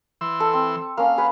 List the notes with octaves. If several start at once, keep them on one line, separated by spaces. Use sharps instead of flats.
E3 C6 E6
A4
C4
A#3 C#4 F5
G#4 B4 F#5